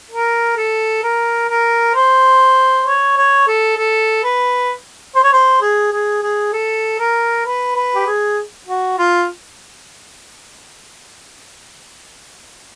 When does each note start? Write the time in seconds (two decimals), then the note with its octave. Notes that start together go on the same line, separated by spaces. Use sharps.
0.11 A#4
0.57 A4
1.03 A#4
1.49 A#4
1.95 C5
2.85 C#5
3.17 C#5
3.47 A4
3.77 A4
4.24 B4
5.16 C5
5.24 C#5
5.33 C5
5.61 G#4
5.91 G#4
6.22 G#4
6.53 A4
6.99 A#4
7.45 B4
7.75 B4
7.95 G4
8.06 G#4
8.67 F#4
8.98 F4